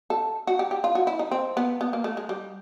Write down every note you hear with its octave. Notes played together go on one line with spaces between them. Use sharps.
A4
F#4
G4
G4
F4
F#4
E4
D#4
C4
B3
B3
A#3
A3
G#3
G3